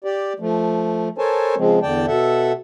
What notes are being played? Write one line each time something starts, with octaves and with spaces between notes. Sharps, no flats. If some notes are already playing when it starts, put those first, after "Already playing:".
G4 D5
F3 A3
A4 A#4 C5 C#5 G#5 A5
C#3 F3 G#3 C4
E2 D3 D5 G5 A5
B2 A4 E5 F#5